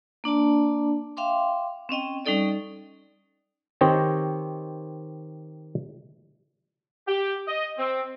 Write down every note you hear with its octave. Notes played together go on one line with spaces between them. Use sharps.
A#3 D4 D5 A5
E5 F5 G5 C6 D6
C4 C#4 D#5 G5
G3 C#4 D#4 A4 D5 D#5
D#3 C4 G4 C5 C#5 D#5
G4
D#5
C4